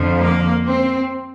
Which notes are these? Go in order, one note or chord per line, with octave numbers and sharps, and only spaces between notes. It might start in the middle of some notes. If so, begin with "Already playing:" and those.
Already playing: F2 D3 F3
A#3
C4